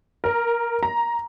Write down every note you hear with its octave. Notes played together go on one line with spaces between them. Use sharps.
A#4
A#5